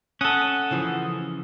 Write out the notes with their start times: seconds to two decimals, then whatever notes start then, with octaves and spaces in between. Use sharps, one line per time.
0.21 C#4 A4 F#5 D#6
0.71 C#3 E3 F3